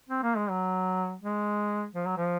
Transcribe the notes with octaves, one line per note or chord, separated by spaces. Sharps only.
C4
A#3
G#3
F#3
G#3
F3
F#3
F3